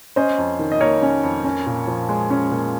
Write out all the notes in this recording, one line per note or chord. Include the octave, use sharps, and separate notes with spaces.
C#4 C5 D#5
F2
D#3
D#5
A#3 A#4 C#5
C#4
F2
C#4
A#2
F3
G#3
C#4
A#2